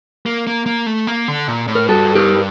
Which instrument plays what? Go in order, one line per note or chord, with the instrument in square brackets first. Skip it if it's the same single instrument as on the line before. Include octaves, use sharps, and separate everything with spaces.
[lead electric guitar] A#3
A#3
A#3
A3
A#3
D3
A#2
A2
[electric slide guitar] A#4
[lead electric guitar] G2 [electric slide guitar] F#4 A4
[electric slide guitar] G4 A#4